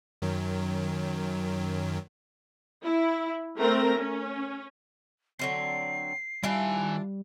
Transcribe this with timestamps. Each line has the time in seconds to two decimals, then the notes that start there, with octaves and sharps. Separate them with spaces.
0.22 F#2 D#3 F#3
2.83 E4
3.57 A3 C4 A#4 A#5
3.97 C#4
5.39 D3 F#3 C4 C7
6.43 D#3 G3 D4 E4 F4 G#5